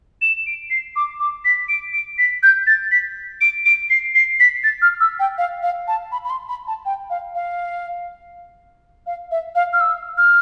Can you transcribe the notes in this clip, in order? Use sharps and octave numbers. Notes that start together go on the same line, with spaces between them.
E7
D7
C7
D6
D6
B6
D7
D7
B6
G6
A6
B6
D7
D7
C7
C7
B6
A6
F6
E6
G5
F5
F5
A5
B5
B5
C6
B5
A5
G5
F5
F5
F5
E5
F5
F6
E6
F6